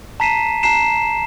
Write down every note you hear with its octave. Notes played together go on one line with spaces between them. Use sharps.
A5 A#5 B6 C7 D#7 E7
A5 A#5 C7 E7